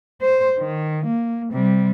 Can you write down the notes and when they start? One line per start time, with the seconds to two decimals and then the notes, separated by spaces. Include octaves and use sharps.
0.21 C5
0.59 D#3
1.06 A#3
1.52 C3 G3